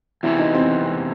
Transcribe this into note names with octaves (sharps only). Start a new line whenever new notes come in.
E2 C3 E3 E4
D#4
C4